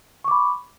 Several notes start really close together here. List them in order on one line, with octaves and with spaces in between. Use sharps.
C#6 D6 B5